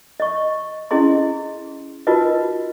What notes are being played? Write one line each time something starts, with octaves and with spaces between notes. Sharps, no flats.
D#5 C#6
C#4 E4 G#4 D#5 C6
D#4 F4 F#4 A#4 B4 D#5